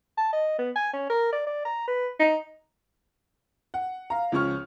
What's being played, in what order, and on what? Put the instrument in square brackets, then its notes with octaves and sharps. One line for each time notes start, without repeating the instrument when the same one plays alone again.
[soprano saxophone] A5
D#5
B3
G#5
C#4
A#4
D5
D5
A#5
B4
D#4
[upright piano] F#5
F5 A#5
C#2 F3 C#4 C#6 F6